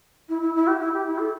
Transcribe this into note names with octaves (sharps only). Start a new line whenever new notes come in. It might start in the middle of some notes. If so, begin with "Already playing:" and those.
E4
E4
E4
G4
E4
G4
E4
A4